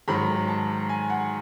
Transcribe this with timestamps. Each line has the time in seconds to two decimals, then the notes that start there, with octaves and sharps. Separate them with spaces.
0.08 G#2 D#3 F#3 B5
0.48 A5
0.89 G#5
1.10 F#5